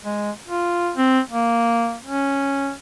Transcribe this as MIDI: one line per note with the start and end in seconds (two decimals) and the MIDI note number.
0.05 0.31 56
0.48 0.91 65
0.96 1.20 60
1.30 1.96 58
2.04 2.72 61